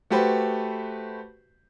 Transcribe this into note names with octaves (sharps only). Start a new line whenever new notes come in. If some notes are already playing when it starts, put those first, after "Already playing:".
A3 F#4 G4 B4 C5